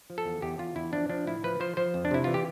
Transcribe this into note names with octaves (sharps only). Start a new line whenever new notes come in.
F3
A4
E2
E2 G4
E2 F4
E2 E4
F3 D4
F3 D4
A2 E4
F3 B4
F3 C5
F3 C5
F2
D4
C3 E4
E3 F4
G4